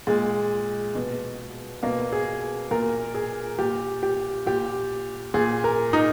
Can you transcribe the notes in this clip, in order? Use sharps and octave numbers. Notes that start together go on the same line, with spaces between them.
A#2 G#3
B2
B2 A#3
G#4
A#2 A#4
G#4
A#2 G4
G4
A#2 G4
A#2 G#4
A#4
D#4